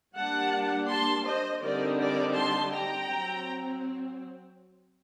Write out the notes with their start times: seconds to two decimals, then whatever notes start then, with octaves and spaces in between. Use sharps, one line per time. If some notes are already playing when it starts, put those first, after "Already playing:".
0.17 G3 A#3 D4 F#5 A5
0.90 A5 C6
1.26 C5 D#5
1.62 D3 G3 C4 D#4 A#4 D5
1.99 A#4 D5
2.35 A5 C6
2.72 G5 A#5
3.08 F#3 C4